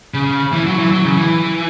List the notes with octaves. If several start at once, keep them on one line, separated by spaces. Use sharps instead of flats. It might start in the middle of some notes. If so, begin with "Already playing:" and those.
C#3
E3
F#3
E3
F#3
C#3
E3